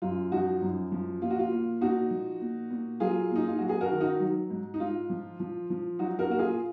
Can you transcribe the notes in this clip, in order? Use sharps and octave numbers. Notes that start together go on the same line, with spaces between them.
F#2 F4
F3 D#4 F#4
F#2
F3
A#2 F4
F#4
F4
A#2
A#2 D#4 F#4
F3
A#2
A#2
F#3 F4 G#4
A#2 D#4
F4
F#3 F#4
G#4
F#4 A#4
D#3
D#4 F#4
F#3
G#2
D#4
G#2 F4
F3
F3
F3
F#3 D#4 F#4
F#4 A#4
A#2 F#4
F4 G#4